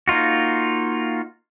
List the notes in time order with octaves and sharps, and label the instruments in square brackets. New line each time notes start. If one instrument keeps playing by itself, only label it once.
[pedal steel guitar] A#3 D#4 F4 F#4